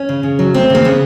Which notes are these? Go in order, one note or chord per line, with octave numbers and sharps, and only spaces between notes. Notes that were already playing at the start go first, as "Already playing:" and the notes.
Already playing: C#4
C#3
C#3
F#3
A3 C4
C#3 A#3
C#3 B3